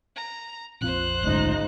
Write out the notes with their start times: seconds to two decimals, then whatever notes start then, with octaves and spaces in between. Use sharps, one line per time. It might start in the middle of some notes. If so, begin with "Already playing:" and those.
0.16 A#5
0.81 A#1 F2 F4 C5 F#6
1.23 D2 G#2 C#3 D#4